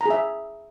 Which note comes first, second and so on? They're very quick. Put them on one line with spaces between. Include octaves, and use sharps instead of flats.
A#5 G#4 E5